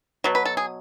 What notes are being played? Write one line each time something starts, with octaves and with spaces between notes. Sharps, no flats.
B2 F#3
B4
A4
G#4